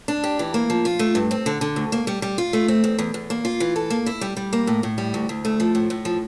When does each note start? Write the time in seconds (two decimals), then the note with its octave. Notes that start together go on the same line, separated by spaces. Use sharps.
0.08 D4
0.24 G4
0.39 E3
0.54 A#3
0.70 F3
0.85 F4
0.99 A3
1.15 G2
1.31 C4
1.46 D3
1.61 D3
1.76 D2
1.92 A#3
2.07 G3
2.22 G3
2.38 F4
2.53 A3
2.68 C4
2.84 E2
2.99 E2
3.14 E2
3.30 A#3
3.45 F4
3.60 E3
3.76 A4
3.90 A#3
4.06 E4
4.21 G3
4.37 G3
4.53 A#3
4.67 A2
4.83 A2
4.98 G3
5.14 D2
5.29 D2
5.45 A3
5.60 F3
5.75 A2
5.90 A2
6.05 F3